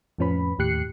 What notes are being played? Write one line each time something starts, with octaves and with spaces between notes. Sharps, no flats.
F2 A2 F3 C#4 B4 B5
D#2 A2 G4 F#6 C7 C#7